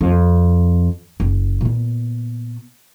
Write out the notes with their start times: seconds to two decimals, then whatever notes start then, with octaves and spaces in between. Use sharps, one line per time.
0.01 F2
1.20 F#1
1.61 A#2 B3